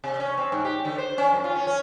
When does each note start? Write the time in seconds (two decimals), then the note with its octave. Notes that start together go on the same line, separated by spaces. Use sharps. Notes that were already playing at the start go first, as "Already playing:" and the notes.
0.04 C3
0.20 C#4
0.38 C4
0.52 G#2
0.65 G4
0.85 D3
0.98 C5
1.18 C#4
1.33 F#2
1.44 F4
1.55 C#4
1.67 C#4